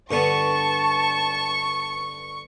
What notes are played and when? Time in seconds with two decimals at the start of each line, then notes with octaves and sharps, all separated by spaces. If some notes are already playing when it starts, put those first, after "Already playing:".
0.11 G2 D3 B3 A5 C#6